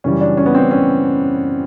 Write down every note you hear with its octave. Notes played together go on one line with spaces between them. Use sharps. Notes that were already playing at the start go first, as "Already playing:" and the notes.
F#2 C#3 E3 G3 C#4
D4
C#4
B3
C4
C#4